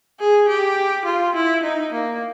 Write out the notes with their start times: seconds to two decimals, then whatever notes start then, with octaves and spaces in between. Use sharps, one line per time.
0.20 G#4
0.48 G4
1.06 F4
1.36 E4
1.63 D#4
1.93 A#3